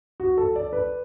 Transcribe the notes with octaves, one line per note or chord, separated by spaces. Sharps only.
F#4
A4
D5
B4